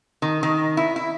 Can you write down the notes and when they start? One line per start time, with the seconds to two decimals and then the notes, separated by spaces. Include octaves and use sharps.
0.22 D#3
0.43 D#3
0.77 E4
0.96 E4